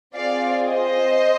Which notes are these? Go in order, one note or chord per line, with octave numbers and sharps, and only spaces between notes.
C4 F4 G#4 D5 F5
C5 D#5